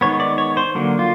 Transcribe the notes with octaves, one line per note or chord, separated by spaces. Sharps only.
D#3 G#3 B3 C#5
D5
C#5
C5
D3 F#3 A#3
F4